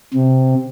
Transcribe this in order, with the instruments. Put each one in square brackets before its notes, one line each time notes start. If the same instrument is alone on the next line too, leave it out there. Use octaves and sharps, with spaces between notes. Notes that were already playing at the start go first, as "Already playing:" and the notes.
[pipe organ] C3